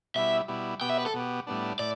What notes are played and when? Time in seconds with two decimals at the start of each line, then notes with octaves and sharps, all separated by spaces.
0.15 B2 G3 E4 E5
0.48 B2 G3 E4
0.81 B2 B3 G4 G5
0.89 E5
0.98 B4
1.06 A4
1.14 B2 B3 G4
1.47 A2 G3 B3 D4
1.79 A2 D5